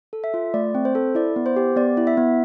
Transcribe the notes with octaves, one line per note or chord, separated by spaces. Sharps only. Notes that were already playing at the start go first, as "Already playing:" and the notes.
A4
E5
F4
A3 D5
C4
C5
A4
E4 D5
B3
C5
G4
B3 D5
E4
E5
B3